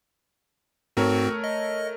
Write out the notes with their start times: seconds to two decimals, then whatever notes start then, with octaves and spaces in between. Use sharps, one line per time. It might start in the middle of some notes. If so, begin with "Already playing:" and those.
0.97 G#2 A3 C4 F#4 A#4 C#5
1.44 D#5